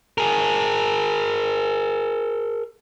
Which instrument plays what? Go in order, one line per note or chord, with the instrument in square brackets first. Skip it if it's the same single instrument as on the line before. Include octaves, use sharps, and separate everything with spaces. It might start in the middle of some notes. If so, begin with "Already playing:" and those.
[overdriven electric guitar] G#4 A#4